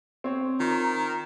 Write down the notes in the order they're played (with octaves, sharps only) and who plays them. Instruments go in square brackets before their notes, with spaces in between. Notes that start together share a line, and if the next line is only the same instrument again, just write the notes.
[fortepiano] C4 C#5
[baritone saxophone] D#3 [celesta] F4 A#5